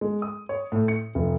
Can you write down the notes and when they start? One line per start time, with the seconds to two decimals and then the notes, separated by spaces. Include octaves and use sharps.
0.01 G#3
0.22 D#6
0.49 C#5
0.72 A2
0.88 C#7
1.15 F1